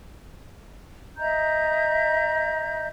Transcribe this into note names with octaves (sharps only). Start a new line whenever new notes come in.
D#5 E5 A#5 G6